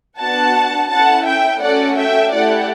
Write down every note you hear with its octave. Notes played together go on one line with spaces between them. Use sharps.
B3 D4 F#4 F#5 A5
C#4 E4 A4 F#5 A5
E5 G5
A3 C#4 F#4 A4 D5 F#5
E5 G5
A3 E4 G4 D5 F#5